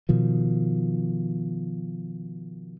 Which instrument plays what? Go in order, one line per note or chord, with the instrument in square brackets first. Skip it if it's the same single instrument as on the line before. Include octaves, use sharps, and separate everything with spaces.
[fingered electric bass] B2 D#3 F3